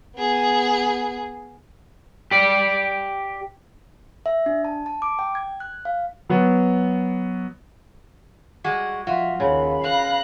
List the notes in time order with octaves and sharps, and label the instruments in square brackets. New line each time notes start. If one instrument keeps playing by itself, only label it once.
[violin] B3 G#4
[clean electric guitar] G4 D5
[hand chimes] E5
D4
A5
A5
D6
G5
G#6
F#6
F5
[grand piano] F#3 B3
[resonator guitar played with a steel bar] G3 G#3 F#4
[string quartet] F3 [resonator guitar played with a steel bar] F4 [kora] F#4 [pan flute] E5
[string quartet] D#2 [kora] C#3 [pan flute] B5
[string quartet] F5 F#6 A#6